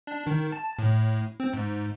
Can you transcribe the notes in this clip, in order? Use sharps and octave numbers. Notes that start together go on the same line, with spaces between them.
D4
D#3
A5
A2
C4
G#2